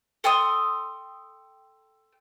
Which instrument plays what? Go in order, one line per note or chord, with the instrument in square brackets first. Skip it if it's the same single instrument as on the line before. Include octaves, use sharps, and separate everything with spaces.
[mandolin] A4 G5 C6 D#6